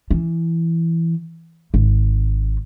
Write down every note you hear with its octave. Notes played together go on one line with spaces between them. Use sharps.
E3
G#1